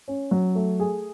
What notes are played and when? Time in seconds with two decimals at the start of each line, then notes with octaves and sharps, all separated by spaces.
0.08 C#4
0.31 F#3
0.55 A3
0.80 G#4